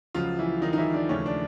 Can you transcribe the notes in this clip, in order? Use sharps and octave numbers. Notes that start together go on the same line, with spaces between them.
C#2 C#3 F3 F#3 F4
E3 E4
D#3 D#4
D#4
E3 E4
D4
D#2 C#3 F3 A3 C#4
D4